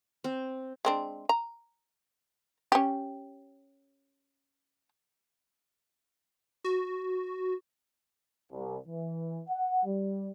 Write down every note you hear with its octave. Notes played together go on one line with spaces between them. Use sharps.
C4
G#3 C4 D4
A#5
C#4 G4
F#4
C2
E3
F#5
G3